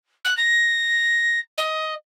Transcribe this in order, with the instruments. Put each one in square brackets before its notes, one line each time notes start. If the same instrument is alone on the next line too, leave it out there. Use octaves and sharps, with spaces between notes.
[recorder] F#6
A#6
D#5